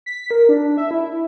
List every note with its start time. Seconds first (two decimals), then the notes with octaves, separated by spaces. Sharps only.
0.06 B6
0.31 A#4
0.49 D4
0.77 E5
0.91 E4